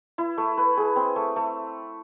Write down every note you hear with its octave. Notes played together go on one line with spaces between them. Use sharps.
E4
A3
B4
G#4
C4
A3
A3